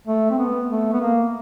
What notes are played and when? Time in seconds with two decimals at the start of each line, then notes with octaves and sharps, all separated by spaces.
0.08 A3
0.30 C4
0.39 B3
0.70 A3
0.93 B3
1.01 A#3